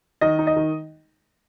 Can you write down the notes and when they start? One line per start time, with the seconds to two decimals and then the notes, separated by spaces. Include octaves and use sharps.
0.21 D#3 D#5
0.39 D#4
0.47 D#5
0.56 D#3